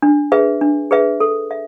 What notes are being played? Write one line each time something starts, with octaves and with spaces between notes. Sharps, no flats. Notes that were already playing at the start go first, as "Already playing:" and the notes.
D4
G#4 B4 E5
D4
G#4 B4 E5
A4
E5